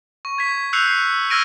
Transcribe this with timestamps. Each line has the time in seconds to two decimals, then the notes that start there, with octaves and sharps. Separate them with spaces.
0.25 C#6
0.38 G#6 B6
0.73 E6 F#6 G6 C7 C#7 F7
1.30 E6 F6 G#6 A#6 D7 D#7